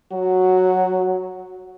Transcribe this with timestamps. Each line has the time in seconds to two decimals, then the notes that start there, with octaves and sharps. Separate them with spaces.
0.12 F#3 F#4